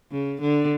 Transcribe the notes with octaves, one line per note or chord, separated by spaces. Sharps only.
C#3
D3